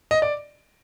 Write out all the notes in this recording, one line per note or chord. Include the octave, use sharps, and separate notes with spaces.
D#5
D5